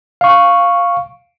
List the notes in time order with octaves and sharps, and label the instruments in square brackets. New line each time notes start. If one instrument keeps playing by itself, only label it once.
[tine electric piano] F5 C#6